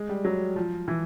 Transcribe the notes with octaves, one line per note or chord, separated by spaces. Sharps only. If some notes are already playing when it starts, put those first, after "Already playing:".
Already playing: G#3
G3
F#3
F3
E3